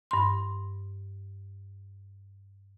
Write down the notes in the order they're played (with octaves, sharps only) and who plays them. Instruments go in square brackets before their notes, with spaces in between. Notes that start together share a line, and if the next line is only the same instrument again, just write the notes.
[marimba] G2 C6